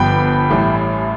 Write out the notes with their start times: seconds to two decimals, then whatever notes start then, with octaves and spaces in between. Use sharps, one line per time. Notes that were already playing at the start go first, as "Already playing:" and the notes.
Already playing: G1 G2 F3 B3 G5 B5
0.51 A1 A2 G3